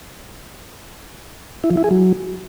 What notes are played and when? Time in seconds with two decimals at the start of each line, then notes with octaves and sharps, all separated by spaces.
1.64 E4
1.70 F3
1.77 E4
1.84 G#4
1.91 F#3